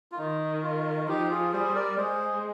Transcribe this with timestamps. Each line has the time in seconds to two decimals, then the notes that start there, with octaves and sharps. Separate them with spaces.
0.12 F4
0.18 D#3 D#4
0.63 F4
1.07 F3 D#4 G4
1.31 F4 G#4
1.52 G3 G#4 C5
1.75 A#4 D5
1.97 G#3 G#4 C5